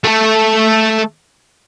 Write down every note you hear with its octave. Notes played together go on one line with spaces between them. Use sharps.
A3 A4